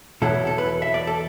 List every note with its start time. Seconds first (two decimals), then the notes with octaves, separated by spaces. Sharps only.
0.22 E2 B2 F#3 A3 E4 A4
0.47 A4
0.58 B4
0.82 E5
0.94 D5
1.07 A4